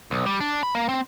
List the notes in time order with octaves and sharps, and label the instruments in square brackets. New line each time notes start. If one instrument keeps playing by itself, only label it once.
[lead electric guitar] B1
G3
D4
B5
A#3
C4